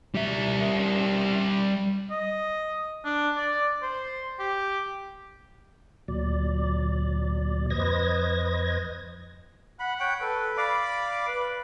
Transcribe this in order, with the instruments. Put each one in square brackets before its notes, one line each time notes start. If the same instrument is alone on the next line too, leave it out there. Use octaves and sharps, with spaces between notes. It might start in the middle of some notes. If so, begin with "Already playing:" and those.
[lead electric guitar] G3 E5
[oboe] D#5
D4
D5
C5
G4
[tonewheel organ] D2 A#2 F#3 D5
F2 B4 C5 D#5 G#6 A#6
[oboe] F#5 [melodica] B5
[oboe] C#5 [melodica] F#5 G5
[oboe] A4 [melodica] B4
[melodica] D5 F5 D6 [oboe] B5
[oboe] B4